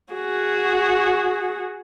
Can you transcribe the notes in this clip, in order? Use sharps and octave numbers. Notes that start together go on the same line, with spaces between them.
F#4 G#4